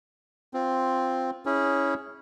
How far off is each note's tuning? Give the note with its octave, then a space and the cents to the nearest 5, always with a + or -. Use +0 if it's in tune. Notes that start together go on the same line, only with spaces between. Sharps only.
C4 +0 F4 +0
C#4 +0 E4 -20 G#4 +0